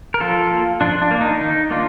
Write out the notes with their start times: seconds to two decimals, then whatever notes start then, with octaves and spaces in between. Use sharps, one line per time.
0.14 A#4
0.20 F3 F4 A4
0.51 A#3
0.81 F3 D4 F4
1.02 D4
1.11 A#3
1.21 D#4
1.41 D#3 D#4
1.71 A#3 D4 F4